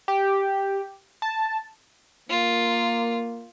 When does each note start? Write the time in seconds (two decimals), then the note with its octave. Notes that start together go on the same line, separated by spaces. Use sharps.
0.08 G4
1.22 A5
2.30 A#3 F4